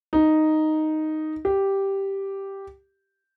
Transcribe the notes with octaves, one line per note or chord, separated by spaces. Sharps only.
D#4
G4